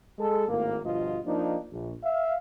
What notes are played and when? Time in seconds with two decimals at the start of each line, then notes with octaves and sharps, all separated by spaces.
0.19 G#3 A4
0.48 G#1 A2 A#3
0.83 G1 B2 F3 F4 D#5
1.26 F3 A#3 D4 D#4
1.71 A#1
2.04 E5 F5